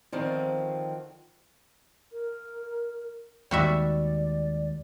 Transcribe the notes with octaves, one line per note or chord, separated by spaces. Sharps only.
D3 D#3 F3 C4
A#4
D#2 D#3 G3 G#3 F#4 D5 E5